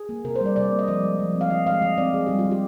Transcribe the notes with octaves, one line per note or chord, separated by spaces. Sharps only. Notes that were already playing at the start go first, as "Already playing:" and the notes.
Already playing: G#4
A#3
C3 A#4
C5
G3 D5
C3 D5
A#3
D#5
F3 D5
G#3
F3
C4
F5
D#3 D#5
G#3 F5
D#3 D#5
C4 D5
D#3 G#4
G3 G4
F4
D#3
G4